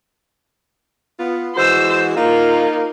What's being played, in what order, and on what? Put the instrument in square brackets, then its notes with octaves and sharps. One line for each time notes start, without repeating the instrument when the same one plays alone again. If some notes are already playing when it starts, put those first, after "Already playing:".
[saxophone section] B3 F4
[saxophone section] E3 G#3 F#4 [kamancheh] C5 E6
[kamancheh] A#3 [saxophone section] D#4 F4